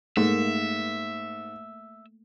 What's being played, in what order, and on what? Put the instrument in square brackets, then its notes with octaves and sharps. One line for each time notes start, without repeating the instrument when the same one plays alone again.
[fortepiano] G#2 [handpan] A3 A#3 [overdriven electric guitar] E5